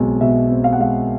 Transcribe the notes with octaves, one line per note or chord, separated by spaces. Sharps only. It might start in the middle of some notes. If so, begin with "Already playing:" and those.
Already playing: B1 G#3 C4
B2 E5
C4
F5
F#5
G#3 F5